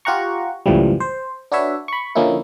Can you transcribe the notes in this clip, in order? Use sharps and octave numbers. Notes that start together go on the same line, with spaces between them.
F4 G4 F#5 A#5 C#6
C#2 F#2 A2 E3 F3 G3
C5
D4 F#4 B4 C#5 E5
B5 C#6
D3 F3 A#3 C#4 D#4 E4